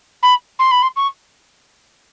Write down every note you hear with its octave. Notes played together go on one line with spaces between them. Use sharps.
B5
C6
B5
C6
C#6